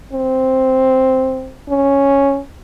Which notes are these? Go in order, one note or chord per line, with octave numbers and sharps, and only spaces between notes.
C4
C#4